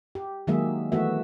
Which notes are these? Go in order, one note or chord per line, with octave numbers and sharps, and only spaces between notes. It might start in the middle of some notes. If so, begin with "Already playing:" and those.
G4
D#3 F#3 G#3 A#3 G#4 E5
E3 A3 B3 F#4 E5